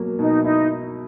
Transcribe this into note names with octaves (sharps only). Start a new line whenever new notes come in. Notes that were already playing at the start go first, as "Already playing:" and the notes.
Already playing: B2 F#3 A#3
B2 D#4
D#4 E4